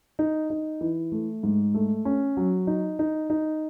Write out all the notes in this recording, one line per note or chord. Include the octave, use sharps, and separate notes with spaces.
D#4
D#4
E3
A3
G#2
A3
C#4
F#3
D#4
D#4
D#4